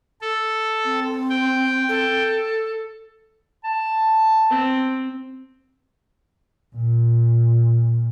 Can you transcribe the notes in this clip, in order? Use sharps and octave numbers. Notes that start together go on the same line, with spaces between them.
A4
C4
G5
A4
A5
C4
A#2